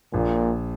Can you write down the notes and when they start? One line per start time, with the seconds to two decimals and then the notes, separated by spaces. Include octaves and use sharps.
0.13 A#1 A#2